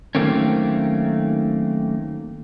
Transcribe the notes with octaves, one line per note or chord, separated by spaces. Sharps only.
D#3 F#3 A3 A#3 C4 C#4